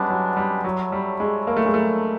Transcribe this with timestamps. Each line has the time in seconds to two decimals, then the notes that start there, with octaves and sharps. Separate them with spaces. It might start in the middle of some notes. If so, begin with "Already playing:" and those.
Already playing: G3 G#3 B3 C#4 D4
0.10 F#3
0.37 G3
0.64 F#3 E4 A4 C#5
0.92 G3
1.20 G#3
1.47 A#3
1.57 A3
1.65 G#3
1.74 A3